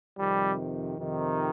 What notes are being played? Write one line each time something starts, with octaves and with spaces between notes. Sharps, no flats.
F2 C3 D#3 G3
F2 C3 D#3